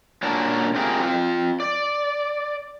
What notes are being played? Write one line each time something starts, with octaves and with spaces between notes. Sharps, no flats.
A#2 C#4 D4 F#4 A#4 A5
C4 F4 G4 G#4 A#4 F5
C4 F4
D5